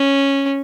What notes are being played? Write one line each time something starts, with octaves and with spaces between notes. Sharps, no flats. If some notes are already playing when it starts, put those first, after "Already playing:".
Already playing: C#4